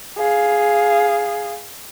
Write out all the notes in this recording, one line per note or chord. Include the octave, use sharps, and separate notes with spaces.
G#4 F5